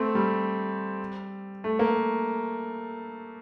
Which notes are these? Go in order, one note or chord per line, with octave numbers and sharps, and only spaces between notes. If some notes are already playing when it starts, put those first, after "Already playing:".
Already playing: A3 C4
G3
A3
A#3